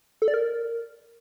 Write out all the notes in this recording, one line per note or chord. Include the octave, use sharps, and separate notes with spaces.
A4
D5
A#4